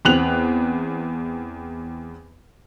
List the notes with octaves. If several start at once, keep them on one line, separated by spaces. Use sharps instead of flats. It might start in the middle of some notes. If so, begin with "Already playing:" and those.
E2 C4 F#6 F7 F#7